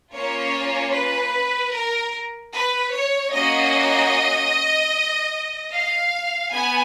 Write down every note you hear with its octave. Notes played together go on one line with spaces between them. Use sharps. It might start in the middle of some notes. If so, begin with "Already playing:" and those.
A#3 C#4 F4 C#5
B4
A#4
B4
C#5
A#3 C#4 F#4 D#5
F5
B3 G#5